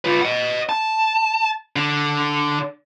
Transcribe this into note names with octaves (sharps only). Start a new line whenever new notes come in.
F4 B4
D#5 F#5
A5
D3